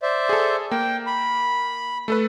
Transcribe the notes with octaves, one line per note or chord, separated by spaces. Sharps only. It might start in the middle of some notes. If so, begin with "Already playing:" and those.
C5 D5 E5
G#4 A4
A#3 G5
B5
A3 A4 B4